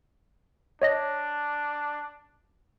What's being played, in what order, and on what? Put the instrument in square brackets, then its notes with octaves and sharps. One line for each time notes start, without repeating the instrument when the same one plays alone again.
[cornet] D4 [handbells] C#5 D#5 A#6